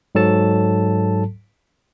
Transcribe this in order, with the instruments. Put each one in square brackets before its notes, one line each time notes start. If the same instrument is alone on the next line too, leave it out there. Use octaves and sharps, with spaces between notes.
[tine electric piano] G#2 F#3 A4 A5